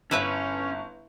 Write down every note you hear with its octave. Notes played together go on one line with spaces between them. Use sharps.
G1 C#4 E4 B4 E5